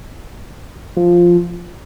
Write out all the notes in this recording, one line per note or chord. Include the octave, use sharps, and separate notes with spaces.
F3